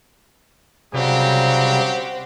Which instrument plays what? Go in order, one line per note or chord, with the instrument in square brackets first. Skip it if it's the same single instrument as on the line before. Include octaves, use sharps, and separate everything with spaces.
[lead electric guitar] C2 [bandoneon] C#3 F#3 G3 [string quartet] C4 F#4 [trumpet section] G4